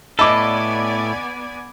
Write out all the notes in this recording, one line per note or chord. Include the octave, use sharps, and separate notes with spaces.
A2 B3 A4 D5 D#5 G#5 B5 D6